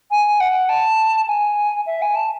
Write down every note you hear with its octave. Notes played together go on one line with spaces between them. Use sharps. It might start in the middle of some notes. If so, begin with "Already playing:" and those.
G#5
F#5
A5
G#5
E5
G#5
A5